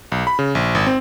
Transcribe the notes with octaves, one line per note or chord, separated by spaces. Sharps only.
B1
B5
C#3
A#1
G#1
C4